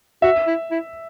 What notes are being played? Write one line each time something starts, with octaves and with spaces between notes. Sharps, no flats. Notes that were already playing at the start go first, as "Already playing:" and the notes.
F#4 E5
E4
E4